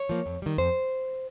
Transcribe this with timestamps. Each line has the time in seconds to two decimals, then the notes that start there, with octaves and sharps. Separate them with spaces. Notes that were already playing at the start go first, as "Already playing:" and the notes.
Already playing: C#5
0.09 F3 A#3
0.26 F2
0.42 D#3 G3
0.58 F2 C5